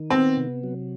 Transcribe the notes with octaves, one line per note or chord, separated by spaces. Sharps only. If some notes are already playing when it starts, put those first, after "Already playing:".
Already playing: D#3
B3 C4
C3
F#3